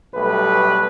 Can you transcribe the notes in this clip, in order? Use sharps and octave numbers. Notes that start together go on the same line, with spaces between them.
B1 G3 A3 B4